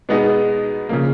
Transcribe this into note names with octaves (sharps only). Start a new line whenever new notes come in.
B2 G#3 B3 D#4 G#4
C#3 F3 A#3